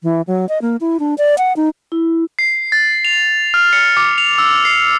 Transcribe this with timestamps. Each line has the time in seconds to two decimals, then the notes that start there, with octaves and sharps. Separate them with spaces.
0.03 E3
0.27 F#3
0.49 D#5
0.62 A#3
0.81 E4
1.00 D4
1.18 D5
1.38 F#5
1.56 D#4
1.92 E4
2.39 C7
2.72 A6
3.05 F7
3.54 F6
3.73 C#7
3.97 D6
4.18 F7
4.38 E6
4.65 C7